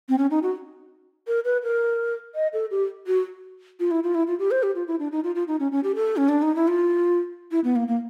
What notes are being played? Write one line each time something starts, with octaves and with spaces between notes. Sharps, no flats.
C4
C#4
D#4
F#4
A#4
B4
A#4
D#5
A4
G4
F#4
F4
E4
F4
E4
F4
G4
C5
G4
F4
E4
D4
D#4
F4
F4
D#4
C#4
C#4
G4
A4
C#4
D4
D#4
E4
F4
E4
B3
A#3
A#3